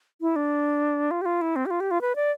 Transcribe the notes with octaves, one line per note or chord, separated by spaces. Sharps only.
E4
D4
F4
G4
F4
E4
C4
G4
F4
G4
F4
B4
D5